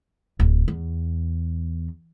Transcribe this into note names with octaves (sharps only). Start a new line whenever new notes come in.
D1
E2